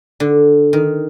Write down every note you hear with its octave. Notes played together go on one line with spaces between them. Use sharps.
D3
D#3